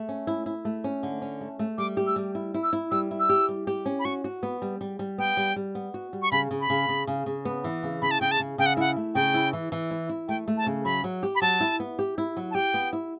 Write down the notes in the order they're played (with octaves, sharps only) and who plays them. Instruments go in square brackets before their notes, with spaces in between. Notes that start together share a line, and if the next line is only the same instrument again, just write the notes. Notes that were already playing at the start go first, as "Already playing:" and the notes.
Already playing: [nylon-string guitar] A3
C#4
E4
E4
A3
C#4
D3
C#4
A3
A3
[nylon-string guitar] G3 [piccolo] D6
[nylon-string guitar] G4
[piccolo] E6
[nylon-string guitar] G3
E4
E4
[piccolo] E6
[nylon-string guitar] E4
[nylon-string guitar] G3 [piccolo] E6
[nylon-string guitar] E4
[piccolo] E6
[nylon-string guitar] G4
G3
G4
C#4
[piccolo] B5
[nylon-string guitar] F#4 [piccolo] C#6
[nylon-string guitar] F#4
B3
G3
G3
G3
[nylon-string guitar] B3 [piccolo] G5
[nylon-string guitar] G3
G3
B3
F#4
G3
[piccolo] C#6
[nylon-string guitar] C#3 [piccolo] B5
[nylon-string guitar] C#3
[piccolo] B5
[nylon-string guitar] C#3
C#3
C#3
C#3
B3
E3
C#3
[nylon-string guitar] C#3 [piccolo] B5
[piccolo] A5
[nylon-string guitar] C#3 [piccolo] G5
[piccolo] A5
[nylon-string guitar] C#3
[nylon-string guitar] C#3 [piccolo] G5
[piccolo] F#5
[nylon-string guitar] E4 [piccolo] F#5
[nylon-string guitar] A3
[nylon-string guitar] C#3 [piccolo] G5
[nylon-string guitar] E4
E3
E3
E4
E4
[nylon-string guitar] A3 [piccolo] G5
[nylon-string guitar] A3
[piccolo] A5
[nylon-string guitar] C#3
[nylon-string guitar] F#3 [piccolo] B5
[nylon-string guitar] F#3
G4
[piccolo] B5
[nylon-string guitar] F#3 [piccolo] A5
[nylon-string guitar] E4
B3
G4
E4
F#3
[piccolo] A5
[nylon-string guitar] G4 [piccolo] G5
[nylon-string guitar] B3
E4